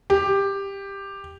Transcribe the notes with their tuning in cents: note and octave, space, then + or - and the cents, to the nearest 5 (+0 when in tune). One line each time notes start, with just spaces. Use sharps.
G4 +10